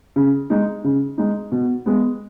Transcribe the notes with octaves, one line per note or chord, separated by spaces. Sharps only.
C#3
G#3 D#4
C#3
G#3 D#4
B2
G#3 B3